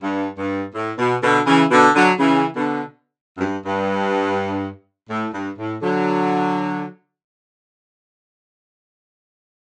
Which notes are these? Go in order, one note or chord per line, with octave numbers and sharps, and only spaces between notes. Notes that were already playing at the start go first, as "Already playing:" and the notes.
G2
G2
A2
B2
B2 D3
C#3 E3
B2 D3
D3 F#3
C#3 E3
B2 D3
F#2
G2
G2
A2
G2
A2
D3 F#3